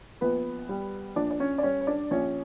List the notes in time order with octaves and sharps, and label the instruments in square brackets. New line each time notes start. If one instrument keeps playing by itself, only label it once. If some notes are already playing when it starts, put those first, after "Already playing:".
[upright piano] A#1 B3 B4
G3
A#1 D4 D5
D5
C#4 C#5
D5
G3 C#4 C#5
C#5
D4 D5
A#1 C#4 C#5